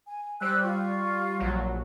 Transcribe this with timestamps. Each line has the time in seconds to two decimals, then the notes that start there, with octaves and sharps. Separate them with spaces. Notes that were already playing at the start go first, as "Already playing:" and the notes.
0.06 G#5
0.41 G3 C5 E6 F#6
0.63 F4 C#6
1.39 A#1 F#3